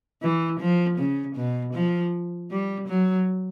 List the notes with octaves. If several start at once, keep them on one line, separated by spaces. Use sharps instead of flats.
E3
F3
C#3
B2
F3
G3
F#3